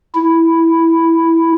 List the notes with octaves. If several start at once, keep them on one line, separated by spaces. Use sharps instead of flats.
E4